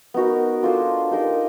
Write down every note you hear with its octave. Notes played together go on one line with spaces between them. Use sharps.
B3 D#4 F#4 A#4
D4 F4 A4 C5
D#4 G4 A#4 D#5